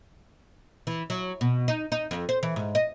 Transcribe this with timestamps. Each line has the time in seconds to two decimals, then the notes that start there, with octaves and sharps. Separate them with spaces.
0.87 E3
1.10 F#3
1.41 B2
1.68 D#4
1.92 D#4
2.11 F2
2.29 C5
2.43 E3
2.56 G#2
2.75 D#5